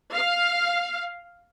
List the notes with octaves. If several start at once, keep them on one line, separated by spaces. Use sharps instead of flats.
F5